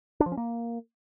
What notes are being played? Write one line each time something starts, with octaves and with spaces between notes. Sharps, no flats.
D4
F3
C#4
A#3